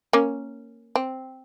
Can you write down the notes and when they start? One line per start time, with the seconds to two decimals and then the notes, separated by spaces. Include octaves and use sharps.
0.13 A#3 C#4
0.95 C4